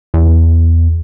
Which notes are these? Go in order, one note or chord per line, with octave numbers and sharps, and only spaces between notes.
E2